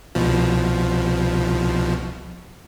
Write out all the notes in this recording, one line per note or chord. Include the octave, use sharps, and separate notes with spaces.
C2 B2 F3